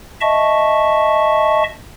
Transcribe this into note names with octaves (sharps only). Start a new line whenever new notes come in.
D#5 E5 A5 C#6